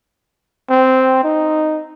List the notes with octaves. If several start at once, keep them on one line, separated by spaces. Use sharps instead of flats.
C4
D#4